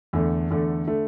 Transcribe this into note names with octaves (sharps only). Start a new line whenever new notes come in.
E2 D3 A3
E2 D3 A3
D3 A3